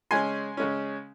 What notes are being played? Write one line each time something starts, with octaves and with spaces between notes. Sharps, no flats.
C#3 G#3 C#4 G#5 C6
C#3 G#3 C#4